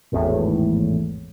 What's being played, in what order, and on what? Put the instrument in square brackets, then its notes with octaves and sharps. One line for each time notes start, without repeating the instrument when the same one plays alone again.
[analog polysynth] G#1 E2 A2